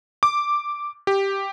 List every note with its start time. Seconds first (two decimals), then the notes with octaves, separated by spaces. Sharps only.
0.23 D6
1.07 G4